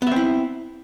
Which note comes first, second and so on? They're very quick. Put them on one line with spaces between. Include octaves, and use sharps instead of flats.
B3 E5 C4 E4